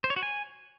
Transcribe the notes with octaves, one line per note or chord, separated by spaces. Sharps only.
C5
C#5
F#4
G#5